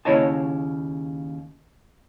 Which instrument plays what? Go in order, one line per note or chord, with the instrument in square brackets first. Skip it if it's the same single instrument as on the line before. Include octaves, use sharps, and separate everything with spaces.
[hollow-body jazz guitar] D#2 C#3 E4 C#5 D#5 A5